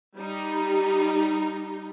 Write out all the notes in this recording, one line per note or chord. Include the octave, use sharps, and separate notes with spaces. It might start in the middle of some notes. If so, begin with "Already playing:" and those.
G3 D#4